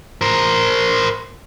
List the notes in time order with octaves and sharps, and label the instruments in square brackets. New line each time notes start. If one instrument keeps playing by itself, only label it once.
[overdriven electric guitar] A#4 C5